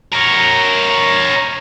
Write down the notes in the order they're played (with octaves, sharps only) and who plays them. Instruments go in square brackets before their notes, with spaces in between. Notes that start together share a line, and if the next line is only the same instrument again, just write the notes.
[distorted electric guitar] A#4 C#5